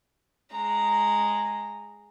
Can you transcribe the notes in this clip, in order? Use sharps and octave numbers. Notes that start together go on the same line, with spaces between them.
G#3 A#5